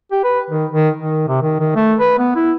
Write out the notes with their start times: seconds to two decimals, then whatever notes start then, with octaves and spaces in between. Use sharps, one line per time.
0.12 G4
0.24 B4
0.50 D#3
0.72 D#3
0.97 D#3
1.28 C3
1.42 D#3
1.60 D#3
1.76 A3
2.00 B4
2.19 B3
2.36 E4